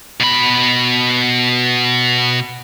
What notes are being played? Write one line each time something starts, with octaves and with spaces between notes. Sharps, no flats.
B2 B5